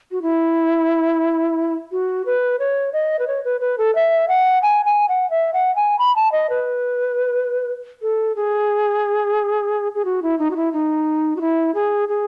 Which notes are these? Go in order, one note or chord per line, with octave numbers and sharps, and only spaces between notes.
F#4
E4
F#4
B4
C#5
D#5
B4
C#5
B4
B4
A4
E5
F#5
G#5
G#5
F#5
E5
F#5
G#5
B5
A5
D#5
B4
A4
G#4
G#4
F#4
E4
D#4
F#4
E4
D#4
F#4
E4
G#4
G#4